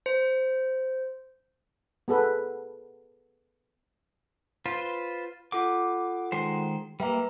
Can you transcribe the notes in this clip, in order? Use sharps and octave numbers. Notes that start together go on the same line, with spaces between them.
C5
B3 G#4 A4 B4
F4 B4 C5
F4 A4 F#5 D6
D#3 G#3 C5
G3 A#3 B4 E5 A#5